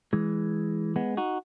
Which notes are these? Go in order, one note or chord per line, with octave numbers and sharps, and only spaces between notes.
E3 G#3
G#3 B3
D#4 F#4